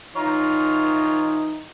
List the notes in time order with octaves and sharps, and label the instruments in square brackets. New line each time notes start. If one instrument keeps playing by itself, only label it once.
[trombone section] E3 D#4 [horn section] F4 C#5 A#5